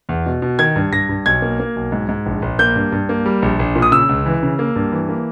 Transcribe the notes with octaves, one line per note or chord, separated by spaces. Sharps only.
E2
B2
B2
D#3 G#6
G2
G2 A#6
G2
B1 G#6
A#3
A#3
B1
G#2
G#2
A#1
A#1
A#3 G6
G2
G2
A#3
G3
A#1
A#1
A#2
D#6
C#3 E6
C#2
E3
C#3
A#3
G2
E3
A#3